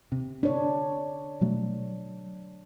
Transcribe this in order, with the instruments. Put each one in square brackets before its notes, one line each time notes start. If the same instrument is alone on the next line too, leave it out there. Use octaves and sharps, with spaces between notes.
[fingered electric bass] C3
[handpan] D4 C#5
[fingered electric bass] B2 F#3 A3